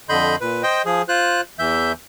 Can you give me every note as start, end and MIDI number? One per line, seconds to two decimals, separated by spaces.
0.09 0.36 41
0.09 0.36 50
0.09 0.36 75
0.09 0.36 83
0.09 0.36 84
0.09 0.36 91
0.41 0.62 46
0.41 0.62 71
0.63 0.82 72
0.63 0.82 75
0.63 0.82 79
0.85 1.02 53
0.85 1.02 68
1.08 1.41 65
1.08 1.41 72
1.08 1.41 90
1.59 1.92 40
1.59 1.92 52
1.59 1.92 76
1.59 1.92 91